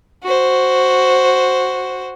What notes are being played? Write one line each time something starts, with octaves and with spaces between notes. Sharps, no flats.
F#4 C5